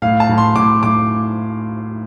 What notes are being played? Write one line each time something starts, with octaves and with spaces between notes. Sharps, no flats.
A2 F5
A5
A2
C6
A2 D6
A2 D6